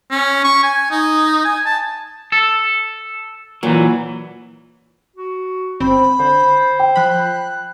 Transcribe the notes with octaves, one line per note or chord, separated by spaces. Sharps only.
C#4
C#6
G#5
D#4
G#5
A5
A4
A#2 E3 F#3
F#4
G1 C4 C5 B5
D3 C5
G5
F3 B5 F#6